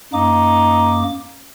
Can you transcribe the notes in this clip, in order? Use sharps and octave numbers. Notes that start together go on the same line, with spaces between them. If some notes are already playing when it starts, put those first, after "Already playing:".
F#2 A#3 D#4 D6